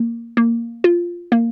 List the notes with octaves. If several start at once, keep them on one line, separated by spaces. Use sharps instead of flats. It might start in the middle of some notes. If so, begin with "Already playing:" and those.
Already playing: A#3
A#3
F4
A#3